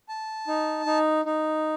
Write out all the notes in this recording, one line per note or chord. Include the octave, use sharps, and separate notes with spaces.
A5
D#4
D#4
D#4